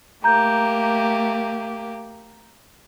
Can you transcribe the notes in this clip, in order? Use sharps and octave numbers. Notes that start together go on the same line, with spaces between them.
A3 A#3 G4 A#5 G6